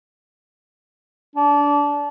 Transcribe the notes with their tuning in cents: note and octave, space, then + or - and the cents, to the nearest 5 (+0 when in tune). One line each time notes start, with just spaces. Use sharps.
D4 -25